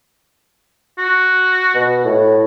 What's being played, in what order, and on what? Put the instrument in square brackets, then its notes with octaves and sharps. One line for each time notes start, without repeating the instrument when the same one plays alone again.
[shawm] F#4
[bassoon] B2
A2